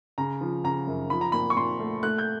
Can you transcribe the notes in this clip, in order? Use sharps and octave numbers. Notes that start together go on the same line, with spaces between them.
C#3 A#5
F3
C#3 A#5
F#2
F3 B5
A#5
A#2 B5
C#6
A#2 C6
A3
A3 F#6
G6